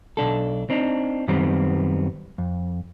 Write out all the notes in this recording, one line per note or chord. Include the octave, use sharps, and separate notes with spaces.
B1 D4 A4
C4 D4 D#4
F#2 D#3 G3 B3 C4
F2